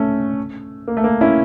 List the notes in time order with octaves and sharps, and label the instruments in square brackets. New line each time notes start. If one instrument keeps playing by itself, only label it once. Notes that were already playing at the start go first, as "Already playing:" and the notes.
Already playing: [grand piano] A3 C#4
A#3
A3
A#3
C#4 E4